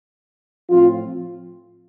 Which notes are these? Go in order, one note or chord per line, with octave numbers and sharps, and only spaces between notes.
A2 F3 C4 F4